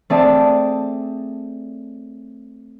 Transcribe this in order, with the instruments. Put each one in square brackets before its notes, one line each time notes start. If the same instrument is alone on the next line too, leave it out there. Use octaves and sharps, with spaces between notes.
[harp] A3 C4 G#4 D5 A5